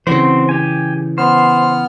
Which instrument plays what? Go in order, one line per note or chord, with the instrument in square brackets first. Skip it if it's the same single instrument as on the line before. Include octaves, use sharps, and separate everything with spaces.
[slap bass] C#3 E3 [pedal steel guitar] C4 F#4 C5
[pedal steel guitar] G4 G#5
[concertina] B3 F6 [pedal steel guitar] C5